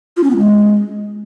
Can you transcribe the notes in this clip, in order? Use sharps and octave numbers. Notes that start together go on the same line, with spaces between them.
F4
C#4
B3
G#3